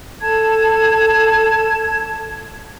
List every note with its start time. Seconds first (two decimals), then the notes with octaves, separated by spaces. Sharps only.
0.20 A4 A5 G#6